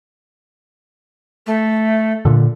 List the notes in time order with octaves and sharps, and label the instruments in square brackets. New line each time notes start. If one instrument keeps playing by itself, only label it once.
[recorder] A3
[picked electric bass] A#2 D3